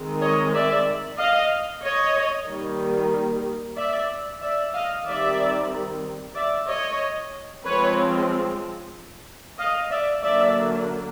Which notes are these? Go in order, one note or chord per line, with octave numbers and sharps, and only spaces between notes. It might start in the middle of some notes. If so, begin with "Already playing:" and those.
Already playing: D#3 G#3 C4
C#5 D#5
D5 E5
D#5 F5
C#5 D#5
D#3 G3 A#3
D5 E5
D5 E5
D#5 F5
D#3 G3 C4 D5 E5
D5 E5
C#5 D#5
F3 G#3 C4 B4 C#5
D#5 F5
D5 E5
D3 F#3 A#3 D4 D5 E5